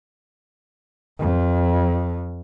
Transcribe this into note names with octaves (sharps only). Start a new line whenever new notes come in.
F2